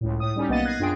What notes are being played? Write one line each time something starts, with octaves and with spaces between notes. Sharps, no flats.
C#2 A2
A2 D#6
G3 C#4 D#4 G4
B1 A#3 B3 D#5 A6 D#7
F#6 G#6 A#6 C7
F#2 D4 F4 G#4 G5 D7